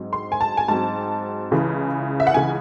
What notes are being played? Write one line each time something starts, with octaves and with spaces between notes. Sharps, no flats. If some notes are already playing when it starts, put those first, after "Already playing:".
Already playing: G#2 F#3 C4
C6
G#5
A5
G#5
G#2 F#3 C4 A5
C#2 C#3 E3
E5
F#5
C#2 C#3 E3 G#5